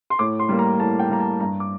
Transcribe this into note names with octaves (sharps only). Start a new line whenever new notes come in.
C6
A2 D6
C6
G3 A#3
A#5
A2 A5
G5
G3 A#3 A#5
A5
G2 A#5
D6